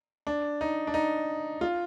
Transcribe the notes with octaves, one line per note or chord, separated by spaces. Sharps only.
D4
D#4
D4
D#4
F4